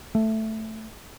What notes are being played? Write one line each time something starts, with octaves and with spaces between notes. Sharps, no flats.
A3